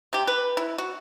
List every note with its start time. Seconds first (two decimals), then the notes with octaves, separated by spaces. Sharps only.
0.13 C3 G4
0.27 B4
0.57 E4
0.78 F#4